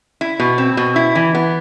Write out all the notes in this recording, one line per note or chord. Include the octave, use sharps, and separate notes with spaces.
E4
B2
C4
B2
E4
E3
B3